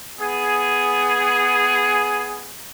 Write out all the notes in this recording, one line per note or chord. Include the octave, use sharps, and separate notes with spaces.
B3 G#4